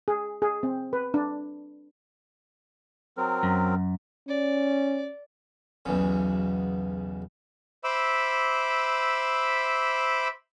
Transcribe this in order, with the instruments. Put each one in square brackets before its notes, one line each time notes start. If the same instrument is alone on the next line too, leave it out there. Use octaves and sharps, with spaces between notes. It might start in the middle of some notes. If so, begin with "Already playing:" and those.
[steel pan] G#4
G#4
C4
B4
D4
[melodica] F#3 C4 A#4
[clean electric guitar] F#2
[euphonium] C#4 [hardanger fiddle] D5
[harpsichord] B1 E2 C#3
[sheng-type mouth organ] C5 E5 B5 D6 E6